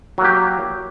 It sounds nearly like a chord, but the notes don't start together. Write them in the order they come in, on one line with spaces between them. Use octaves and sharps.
F#3 A#3 G4